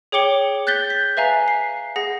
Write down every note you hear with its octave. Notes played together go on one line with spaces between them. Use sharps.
G#4 C#5 G5 D6 C#7 G7
F#6 G6 A6 B6 G7
B6
B4 E5 F5 G#5 A#5
C7
G#4 F#5 A#6